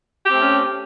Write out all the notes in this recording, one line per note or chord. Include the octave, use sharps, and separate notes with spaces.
A3 C4 C#4 G4